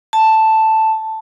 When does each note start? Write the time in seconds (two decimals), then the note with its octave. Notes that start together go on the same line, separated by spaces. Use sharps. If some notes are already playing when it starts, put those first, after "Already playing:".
0.13 A5